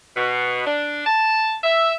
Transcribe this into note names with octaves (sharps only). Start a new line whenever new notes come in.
B2
D4
A5
E5